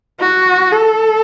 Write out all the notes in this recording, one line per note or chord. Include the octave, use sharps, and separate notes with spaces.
F#4
A4